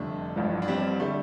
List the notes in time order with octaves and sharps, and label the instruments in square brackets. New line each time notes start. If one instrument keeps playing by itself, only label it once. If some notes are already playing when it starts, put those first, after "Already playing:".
Already playing: [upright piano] F1 F2 D3 G3 [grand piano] A3 D4
[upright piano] A1 G2 F3
[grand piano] D4
G3 C4
[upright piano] D3 G3 [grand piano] A3